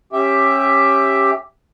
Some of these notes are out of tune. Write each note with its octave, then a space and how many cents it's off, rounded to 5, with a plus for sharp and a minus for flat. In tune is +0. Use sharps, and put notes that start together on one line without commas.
C#4 -20 G4 +5 E5 +0